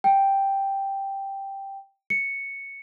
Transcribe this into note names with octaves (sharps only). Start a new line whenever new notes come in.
G5
C#7